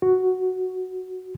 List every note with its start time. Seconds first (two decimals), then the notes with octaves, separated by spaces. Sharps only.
0.02 F#4